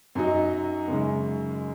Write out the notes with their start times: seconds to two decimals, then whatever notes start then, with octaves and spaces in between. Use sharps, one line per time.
0.15 F#2 F#3 D#4 F#4 D#5
0.88 F#2 C#3 G#3